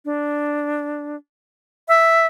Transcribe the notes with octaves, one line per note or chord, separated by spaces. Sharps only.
D4
E5